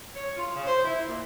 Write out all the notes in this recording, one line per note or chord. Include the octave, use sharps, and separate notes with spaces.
C#5
F4
C#3
C5
E4
A#2